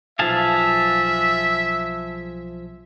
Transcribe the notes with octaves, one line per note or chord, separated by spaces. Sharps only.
B1 F3 G#4 E5 F5 A5